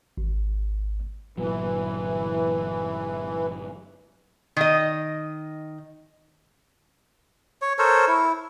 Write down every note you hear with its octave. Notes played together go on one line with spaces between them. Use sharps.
G#1
G1 A#2 E3 F#3
D#3 D#5
C#5
A4 A#4 C5 C#5
E4